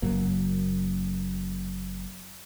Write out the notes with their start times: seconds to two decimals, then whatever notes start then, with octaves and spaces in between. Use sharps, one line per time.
0.02 F#1 F#2 F#3 A#3